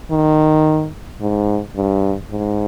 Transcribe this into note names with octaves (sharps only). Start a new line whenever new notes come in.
D#3
G#2
G2
G#2